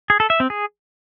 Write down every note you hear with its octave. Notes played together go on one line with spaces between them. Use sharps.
G#4
A4
E5
C4
G#4